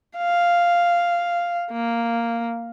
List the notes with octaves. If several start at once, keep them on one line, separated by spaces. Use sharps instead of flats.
F5
A#3